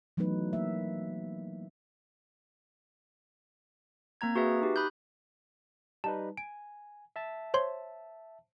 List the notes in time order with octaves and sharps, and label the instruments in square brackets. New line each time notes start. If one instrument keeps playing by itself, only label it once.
[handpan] E3 F#3 A3 B3 D#4 B4
A#3 E5
[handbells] A#3 C4 A#5 G#6
F#4 G#4 B4 E5
D#4 G4
B5 D#6 F#6 G6
[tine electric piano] G3 D#4 B4 [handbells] A5
[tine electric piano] G#5 [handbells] D7
[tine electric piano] E5 A5
[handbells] C5 C#5 C6